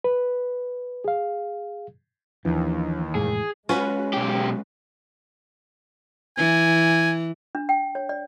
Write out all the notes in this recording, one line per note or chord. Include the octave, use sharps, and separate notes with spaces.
B4
G#4 F5
D#2 E3 F3 D4
F1 A2 G#3 G#4
G#3 C#4 F4 F#4 B4
B1 G4
E3 G#5
D4
G5
C#5
D5